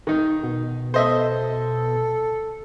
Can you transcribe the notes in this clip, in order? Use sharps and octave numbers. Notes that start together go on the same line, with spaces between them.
D#3 D#4
B2
A4 C5 D#5 E5